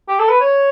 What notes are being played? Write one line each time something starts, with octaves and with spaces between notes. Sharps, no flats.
G4
A4
B4
C#5